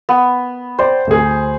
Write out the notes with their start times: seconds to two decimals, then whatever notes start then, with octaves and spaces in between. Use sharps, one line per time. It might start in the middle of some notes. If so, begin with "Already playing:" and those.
0.09 B3
0.79 C5 D5 G5
1.07 D2 G#4